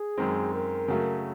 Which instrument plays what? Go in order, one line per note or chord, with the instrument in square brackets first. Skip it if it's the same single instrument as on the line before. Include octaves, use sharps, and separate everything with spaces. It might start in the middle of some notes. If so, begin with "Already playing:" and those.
Already playing: [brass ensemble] G#4
[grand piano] F#2 D#3 G#3 C4
[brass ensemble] A#4
[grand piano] C#3 F#3 A3